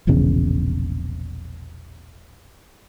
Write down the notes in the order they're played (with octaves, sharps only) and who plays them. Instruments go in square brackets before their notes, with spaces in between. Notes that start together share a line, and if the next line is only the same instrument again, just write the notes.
[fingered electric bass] E1 A#1 E2 C#3